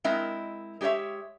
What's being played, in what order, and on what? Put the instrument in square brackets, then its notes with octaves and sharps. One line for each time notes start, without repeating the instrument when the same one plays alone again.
[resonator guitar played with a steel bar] G#3 C4 E4 A#4 D#5
G#3 G4 G#4 C#5 E5